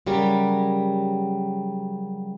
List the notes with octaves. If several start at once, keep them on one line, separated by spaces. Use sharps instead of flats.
C#3 F#3 G3 G4 A#4